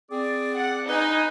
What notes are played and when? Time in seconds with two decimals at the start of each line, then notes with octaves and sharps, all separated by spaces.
0.10 C4 G#4 D5
0.55 F#5
0.88 D#4 B4 G#5